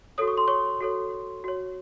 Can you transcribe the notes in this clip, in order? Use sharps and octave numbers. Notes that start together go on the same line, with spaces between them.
F#4 A4 C#5 D#6
C#6
C6
C#5 C#6
F#4 A4 C#5
F#4 C#5